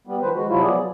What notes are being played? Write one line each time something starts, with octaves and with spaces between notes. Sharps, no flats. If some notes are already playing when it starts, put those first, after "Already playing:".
G3 B3
D#3 F3 B4 C5
G#3 F#4
C3 F3 F#3 E4 F4
F#3 B3 G#4 D5
F#3